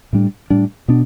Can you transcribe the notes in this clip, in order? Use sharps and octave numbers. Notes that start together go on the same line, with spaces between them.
A2 G3 D4
A2 G3 D4
B2 B3 D4